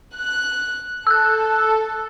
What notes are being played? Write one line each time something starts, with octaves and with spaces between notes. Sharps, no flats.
F#6
A4 E6 F#6